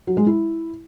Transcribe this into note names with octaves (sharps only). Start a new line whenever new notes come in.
F#3
G#3
E4